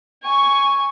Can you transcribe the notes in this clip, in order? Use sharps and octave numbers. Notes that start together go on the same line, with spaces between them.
G#5 C#6